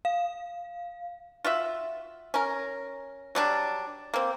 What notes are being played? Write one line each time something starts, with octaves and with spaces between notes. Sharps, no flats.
F5
F4 F#4 E5
C#4 A#4
F#3 G3 D4
A#3 C4